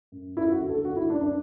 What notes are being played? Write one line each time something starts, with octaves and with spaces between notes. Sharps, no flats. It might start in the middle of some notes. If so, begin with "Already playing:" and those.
F#2
F#2 E4
F#4
D3
A4
D3 F#4
E4
F#2 D4
D4